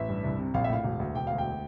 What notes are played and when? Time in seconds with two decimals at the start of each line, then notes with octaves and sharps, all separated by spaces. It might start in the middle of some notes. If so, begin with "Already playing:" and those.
Already playing: A1 E5
0.09 G2
0.24 C2
0.39 C3
0.54 A#1 F5
0.64 E5
0.70 A2 F5
0.84 E1
1.00 D2
1.15 E1 G5
1.27 D2 F5
1.38 G5